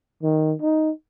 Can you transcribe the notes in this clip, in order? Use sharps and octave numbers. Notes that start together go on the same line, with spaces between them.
D#3
D#4